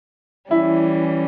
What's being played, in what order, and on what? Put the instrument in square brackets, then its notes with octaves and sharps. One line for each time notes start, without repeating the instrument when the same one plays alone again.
[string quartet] E3 G3 C#4 [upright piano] E4